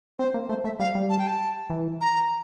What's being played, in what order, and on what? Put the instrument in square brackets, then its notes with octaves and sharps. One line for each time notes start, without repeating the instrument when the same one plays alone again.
[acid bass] C4 [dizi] C5
[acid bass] A#3
[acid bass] A3 [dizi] C5
[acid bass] A3 [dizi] E5
[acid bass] G3 [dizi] F5
[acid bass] G3
[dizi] A5
G5
A5
[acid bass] E3
[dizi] A#5